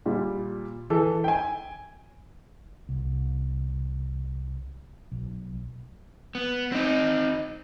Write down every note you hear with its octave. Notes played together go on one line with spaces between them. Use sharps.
A#2 G3
E3 A4
G5 G#5
C2
B1
B3
C4 D#4